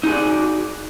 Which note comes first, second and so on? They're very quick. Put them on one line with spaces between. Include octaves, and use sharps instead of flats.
D#4 G#4 F#4 D5